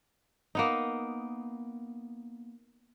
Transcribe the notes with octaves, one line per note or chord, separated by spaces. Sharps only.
A#3 B3 D#4